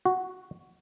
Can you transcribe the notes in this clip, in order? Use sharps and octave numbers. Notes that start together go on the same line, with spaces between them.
F#4